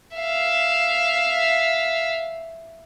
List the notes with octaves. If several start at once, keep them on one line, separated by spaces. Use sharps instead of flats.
E5 F5